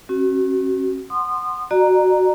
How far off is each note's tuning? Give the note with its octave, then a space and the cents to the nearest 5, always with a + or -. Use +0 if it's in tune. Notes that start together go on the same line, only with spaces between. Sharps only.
C#4 -40 F#4 +25
F#5 +0 C6 +0 D#6 -30
F#4 +0 D5 +40 A#5 +0